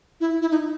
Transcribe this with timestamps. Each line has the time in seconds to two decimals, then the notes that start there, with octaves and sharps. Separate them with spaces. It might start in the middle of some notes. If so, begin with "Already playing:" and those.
0.20 E4
0.41 E4
0.51 D#4